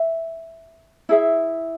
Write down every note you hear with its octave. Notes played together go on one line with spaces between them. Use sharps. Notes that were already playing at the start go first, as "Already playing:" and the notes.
Already playing: E5
E4 G#4 E5